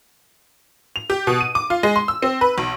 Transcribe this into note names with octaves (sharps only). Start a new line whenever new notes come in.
F7
G4
B2
D#7
D6
F4
G#3
C6
E6
C4
B4
B1